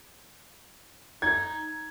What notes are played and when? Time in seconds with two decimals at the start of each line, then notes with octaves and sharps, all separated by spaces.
1.22 D#4 G#6